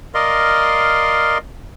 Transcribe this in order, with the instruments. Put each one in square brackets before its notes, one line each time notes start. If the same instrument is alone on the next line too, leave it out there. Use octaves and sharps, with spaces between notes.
[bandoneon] A#4 D5 D#5 F5 C6